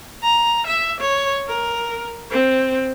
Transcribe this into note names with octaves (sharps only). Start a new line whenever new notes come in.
A#5
E5
C#5
A#4
C4